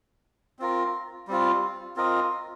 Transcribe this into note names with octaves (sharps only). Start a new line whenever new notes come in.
C4 F4 A#4
G3 C4 F4
C4 F4 A#4 D#5